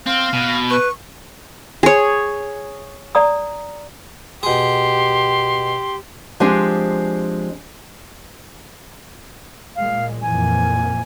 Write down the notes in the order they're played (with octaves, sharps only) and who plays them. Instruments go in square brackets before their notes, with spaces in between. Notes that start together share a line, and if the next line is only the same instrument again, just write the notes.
[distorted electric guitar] C4 [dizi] F5
[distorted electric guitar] B2
[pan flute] B4 [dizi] C#6
[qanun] G#4 C#5
[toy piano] D5 A#5 D#6
[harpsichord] B2 G#4 [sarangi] G4 [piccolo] C6
[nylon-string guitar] F3 G#3 C4 D4 G4 G#5
[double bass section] A#2 G#3 [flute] F5
[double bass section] F2 A#2 E3 [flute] G#5